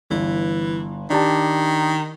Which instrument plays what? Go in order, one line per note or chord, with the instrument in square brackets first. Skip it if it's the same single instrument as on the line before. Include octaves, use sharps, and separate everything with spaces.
[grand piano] G1 [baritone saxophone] E3
[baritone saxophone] D#3 [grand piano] D4 G4 A5